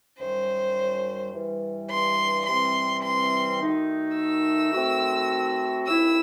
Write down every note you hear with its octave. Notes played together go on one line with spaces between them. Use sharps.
F#2 D#3 G3 C5
G2 E3 G3
C6
C3 E3 G3 C4 C6
C6
D#3 A3 D#4 F#4
E6
D#3 A3 C4 F#4
D#2 D#3 A3 C4 E4 E6